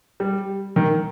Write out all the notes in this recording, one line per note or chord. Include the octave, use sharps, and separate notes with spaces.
G3
D#3